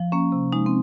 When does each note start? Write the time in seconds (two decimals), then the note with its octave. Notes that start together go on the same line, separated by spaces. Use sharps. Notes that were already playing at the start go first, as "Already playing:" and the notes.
Already playing: F3
0.12 A#3 C#4
0.32 C3
0.53 G#3 D#4
0.66 C4